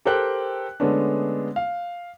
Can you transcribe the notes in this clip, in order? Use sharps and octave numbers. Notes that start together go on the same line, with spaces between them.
G4 A4 A#4 C5 G5 F#6
D3 G#3 A3 B3 C#4 D4
F5